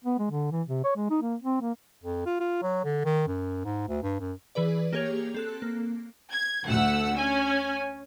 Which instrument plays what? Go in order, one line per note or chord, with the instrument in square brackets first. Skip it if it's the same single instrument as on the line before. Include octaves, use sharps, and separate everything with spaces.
[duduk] B3
G#3
D3
E3
C3
C#5
G#3
D#4
A#3
C4
A#3
[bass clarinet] F2
F4
F4
F#3
D3
D#3
F#2
G#2
D2
G2
F#2
[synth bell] E3 G#4 B4 D5
A#3 G4 G#4 C#5 G#6 F7
C4 A4 F#6
A#3
[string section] G#6
D2 A3 F#5 E6
C#4 G#5